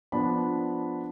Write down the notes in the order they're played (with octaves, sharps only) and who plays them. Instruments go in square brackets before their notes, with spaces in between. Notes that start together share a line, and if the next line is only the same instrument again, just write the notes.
[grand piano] F3 B3 D4 B5